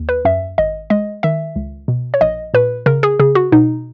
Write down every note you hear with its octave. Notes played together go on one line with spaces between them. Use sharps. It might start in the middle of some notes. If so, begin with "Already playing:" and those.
Already playing: D#2
B4
F#2 E5
G#1 D#5
G#3 D#5
D#3 E5
C#2
B2
C#5
A#1 D#5
A#2 B4
C#3 A#4
G#4
C#3 G#4
F#4
B2 D#4